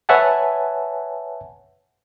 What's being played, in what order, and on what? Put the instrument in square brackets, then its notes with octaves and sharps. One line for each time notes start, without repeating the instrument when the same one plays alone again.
[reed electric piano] B4 C#5 E5 F#5 G#5 A5